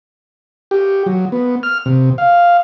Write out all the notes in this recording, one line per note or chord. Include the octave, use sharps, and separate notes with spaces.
G4
F#3
B3
F6
C3
F5